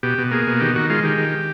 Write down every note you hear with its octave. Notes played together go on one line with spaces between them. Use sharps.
B2 G4
B2
A#3 G#4
B2
D#3 G4
D#3 F#4
G#3 F4
D#3 G4
D#3